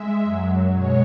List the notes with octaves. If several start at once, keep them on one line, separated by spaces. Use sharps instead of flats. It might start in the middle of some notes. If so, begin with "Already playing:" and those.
Already playing: G#3 E5
F#2 F#3
B2 G#3 C#5